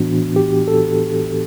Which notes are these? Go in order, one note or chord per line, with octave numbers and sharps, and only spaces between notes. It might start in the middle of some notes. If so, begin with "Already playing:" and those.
Already playing: A2 E3 B3 D4 F#4
G4
A4